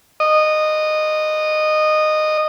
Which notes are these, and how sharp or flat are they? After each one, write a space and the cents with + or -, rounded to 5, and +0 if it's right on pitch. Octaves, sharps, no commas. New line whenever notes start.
D#5 -15